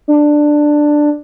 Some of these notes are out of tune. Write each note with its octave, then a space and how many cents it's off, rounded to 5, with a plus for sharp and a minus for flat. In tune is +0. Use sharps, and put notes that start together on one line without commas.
D4 +10